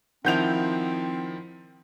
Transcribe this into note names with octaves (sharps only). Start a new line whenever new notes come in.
D#3 F3 C4 E4 F#5 G6 F7